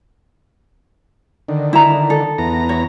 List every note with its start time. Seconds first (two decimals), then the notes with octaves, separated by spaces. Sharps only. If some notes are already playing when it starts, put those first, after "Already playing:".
1.49 D3 D#3
1.73 E4 A#5
2.10 A4
2.38 E2 B3 A#5
2.69 C#5